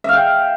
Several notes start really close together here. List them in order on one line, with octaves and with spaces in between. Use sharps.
E5 F5 G5